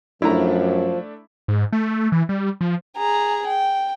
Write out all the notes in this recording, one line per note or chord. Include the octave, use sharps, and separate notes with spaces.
F#2 F3 A3 D4 E4 A#5
G#2
A3
E3
G3
F3
G#4 A#5
G5